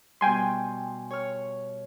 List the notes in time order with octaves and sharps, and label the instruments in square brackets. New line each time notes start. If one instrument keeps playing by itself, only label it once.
[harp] B2 G3 [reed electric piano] G5 G#5 C6
[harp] C#5 F6